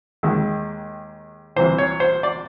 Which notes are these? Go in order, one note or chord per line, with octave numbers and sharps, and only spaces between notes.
D#2 D#3 G#3
C2 C3 E3 C5
C#5
C5
D5